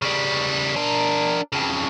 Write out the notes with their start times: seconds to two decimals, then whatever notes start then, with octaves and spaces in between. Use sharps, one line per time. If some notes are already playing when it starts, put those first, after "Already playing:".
0.02 C#3 G3
0.76 D4 A#4
1.53 F2 C#3